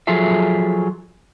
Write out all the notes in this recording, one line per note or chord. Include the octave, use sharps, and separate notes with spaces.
F3 F#3 F4 G#4 A4 E5